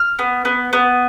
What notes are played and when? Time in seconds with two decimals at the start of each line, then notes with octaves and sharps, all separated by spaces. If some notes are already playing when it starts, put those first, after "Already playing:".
Already playing: F6
0.19 B3
0.45 B3
0.73 B3